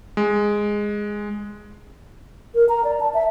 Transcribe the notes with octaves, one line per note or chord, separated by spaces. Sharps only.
G#3
A#4
A#5
D5
A5
E5